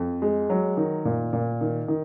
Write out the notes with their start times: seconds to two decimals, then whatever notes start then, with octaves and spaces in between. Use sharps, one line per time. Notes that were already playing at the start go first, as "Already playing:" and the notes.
Already playing: F2
0.22 G#3
0.50 F#3
0.77 D#3
1.05 A#2
1.33 A#2
1.61 D#3
1.88 D#3